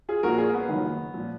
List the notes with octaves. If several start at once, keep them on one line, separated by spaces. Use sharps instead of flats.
F4 G#4
A#1 A#2 F3 F#4 A#4
F4 G#4
B3
F#1 F#2 D#3
A#2 F3